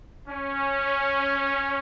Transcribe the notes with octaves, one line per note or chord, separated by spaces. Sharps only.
C#4